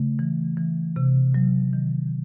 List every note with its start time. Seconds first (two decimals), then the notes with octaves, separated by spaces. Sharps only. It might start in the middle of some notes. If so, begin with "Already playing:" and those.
Already playing: C#3 A3
0.19 E3
0.57 E3
0.96 C3
1.34 F#3
1.73 D#3